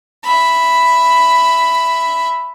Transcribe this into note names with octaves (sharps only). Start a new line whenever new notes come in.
E5 B5